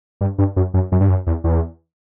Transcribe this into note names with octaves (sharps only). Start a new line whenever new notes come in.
G2
G2
F#2
F#2
F#2
G2
F#2
E2
E2